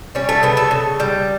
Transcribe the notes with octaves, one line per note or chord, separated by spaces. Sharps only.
G3 C#4
A3
C#3 B3
A4
C#3
G3